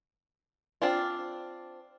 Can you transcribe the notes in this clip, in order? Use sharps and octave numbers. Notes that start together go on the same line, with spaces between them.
C4 D4 F4